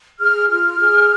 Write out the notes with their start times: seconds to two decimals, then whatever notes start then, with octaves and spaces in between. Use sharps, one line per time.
0.20 G#4 F6
0.49 F4 F6
0.79 G#4